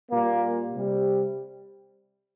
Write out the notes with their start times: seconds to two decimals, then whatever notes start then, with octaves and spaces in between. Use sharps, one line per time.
0.11 A#2 G3 A#3
0.72 C3 G3